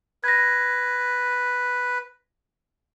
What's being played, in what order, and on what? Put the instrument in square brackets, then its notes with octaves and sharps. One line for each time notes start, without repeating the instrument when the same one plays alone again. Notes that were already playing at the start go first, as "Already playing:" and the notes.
[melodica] B4 [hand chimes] G#6 A#6